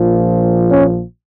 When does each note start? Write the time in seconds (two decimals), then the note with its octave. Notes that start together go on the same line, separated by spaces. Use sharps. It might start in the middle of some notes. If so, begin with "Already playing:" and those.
Already playing: A#1 A#2 F3
0.70 C#4